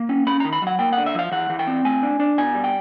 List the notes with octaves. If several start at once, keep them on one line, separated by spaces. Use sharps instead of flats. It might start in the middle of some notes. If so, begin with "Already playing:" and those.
Already playing: A#3
C#4
C#4 B5
D#3 A#5
B5
F#3 F#5
A#3 G5
D3 F#5
E5
F3 F5
E3 F#5
E3
G5
C4
A3 G#5
D4
D4
B2 G#5
G3
G5